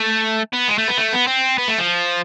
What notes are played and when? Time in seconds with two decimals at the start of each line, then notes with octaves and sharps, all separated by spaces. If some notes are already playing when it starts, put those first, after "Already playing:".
Already playing: A3
0.53 B3
0.68 G#3
0.78 A3
0.88 B3
0.98 A3
1.13 B3
1.27 C4
1.58 B3
1.68 A3
1.78 F3